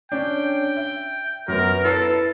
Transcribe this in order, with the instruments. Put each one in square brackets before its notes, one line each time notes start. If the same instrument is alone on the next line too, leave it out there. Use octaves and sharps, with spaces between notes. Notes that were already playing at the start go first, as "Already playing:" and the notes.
[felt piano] C#4 D4 [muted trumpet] G5
[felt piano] E5
[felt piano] F#2 B3 [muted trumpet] A#4
[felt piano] E4 B4 C7 [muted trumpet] A4